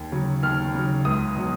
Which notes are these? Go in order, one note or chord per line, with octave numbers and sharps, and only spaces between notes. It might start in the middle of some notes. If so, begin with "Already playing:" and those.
Already playing: D#2
C#3 F#3
D#2 F6
C#3 F#3
C#2 D#6
B2 F#3